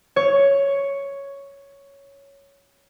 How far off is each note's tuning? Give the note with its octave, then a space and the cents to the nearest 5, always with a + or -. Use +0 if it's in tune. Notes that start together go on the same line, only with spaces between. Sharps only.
C#5 +5